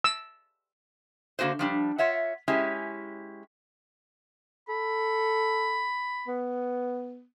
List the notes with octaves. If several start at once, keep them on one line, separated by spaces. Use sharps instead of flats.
E6
D3 A#3 F#4 B4 C5
F3 G3 D4
F4 C#5 E5 F#5
G#3 C#4 E4 G4
A4 B5
B3